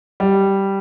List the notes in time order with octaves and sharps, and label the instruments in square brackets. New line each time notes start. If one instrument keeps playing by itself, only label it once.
[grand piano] G3